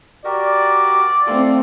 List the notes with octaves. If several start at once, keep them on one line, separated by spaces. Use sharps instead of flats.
F#4 G4 A#4 D5
A3 C4 F4 A4